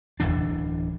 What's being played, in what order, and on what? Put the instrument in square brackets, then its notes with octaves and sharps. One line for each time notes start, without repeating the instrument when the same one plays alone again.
[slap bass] D1 B1 E3 D4